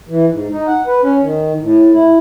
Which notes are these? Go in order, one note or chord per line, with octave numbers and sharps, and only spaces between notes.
E3
G#2
D#4
F#5
B4
C#4
D#3
A2
E4